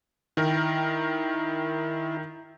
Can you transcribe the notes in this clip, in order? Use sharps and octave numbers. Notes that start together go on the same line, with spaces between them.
D#3 E4 A#4 G5